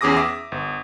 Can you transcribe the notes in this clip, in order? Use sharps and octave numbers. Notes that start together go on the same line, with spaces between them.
E2 C#4 G#4 D6 D#6 A#6
E5 D6 A#6
G1